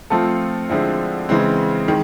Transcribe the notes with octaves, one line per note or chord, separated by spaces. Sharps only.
F3 A3 C4 F4 A4
D3 F3 G#3 C4 E4
C#3 E3 G#3 C4
D#3 G#3